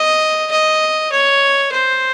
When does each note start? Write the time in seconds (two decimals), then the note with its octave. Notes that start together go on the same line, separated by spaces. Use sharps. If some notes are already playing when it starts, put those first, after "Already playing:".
Already playing: D#5
0.51 D#5
1.11 C#5
1.72 C5